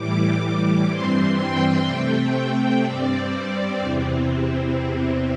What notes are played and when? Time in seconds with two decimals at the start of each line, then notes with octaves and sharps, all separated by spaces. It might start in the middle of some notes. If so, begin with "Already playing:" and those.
Already playing: A2 E3 G3 D6
0.41 D6
0.89 G2 E3 G3 C4 C6
1.38 G5
1.86 C3 A3 C4
2.83 G2 G3 C4 D5
3.81 E2 C3 E3 C4